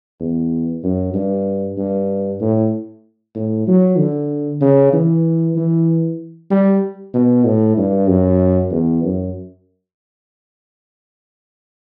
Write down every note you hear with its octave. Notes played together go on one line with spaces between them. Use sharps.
E2
F#2
G2
G2
A2
A2
F#3
D3
C#3
E3
E3
G3
B2
A2
G2
F#2
E2
F#2